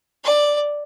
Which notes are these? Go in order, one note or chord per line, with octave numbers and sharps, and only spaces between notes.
D5